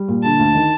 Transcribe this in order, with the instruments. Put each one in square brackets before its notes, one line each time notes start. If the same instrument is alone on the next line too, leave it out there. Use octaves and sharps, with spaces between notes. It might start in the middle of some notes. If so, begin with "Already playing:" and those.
Already playing: [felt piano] G3
A#2
[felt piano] D3 [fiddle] A5
[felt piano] D2
D#3